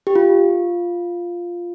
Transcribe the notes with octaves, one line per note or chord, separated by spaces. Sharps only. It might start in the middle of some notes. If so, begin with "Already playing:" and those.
G4
F4